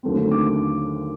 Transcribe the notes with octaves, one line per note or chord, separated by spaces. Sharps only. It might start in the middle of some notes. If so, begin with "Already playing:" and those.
D#2 D3 F#3 A3 C4
D6